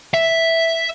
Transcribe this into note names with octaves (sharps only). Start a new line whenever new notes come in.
E5